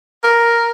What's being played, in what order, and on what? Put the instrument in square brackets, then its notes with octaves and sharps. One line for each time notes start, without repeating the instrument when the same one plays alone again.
[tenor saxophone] A#4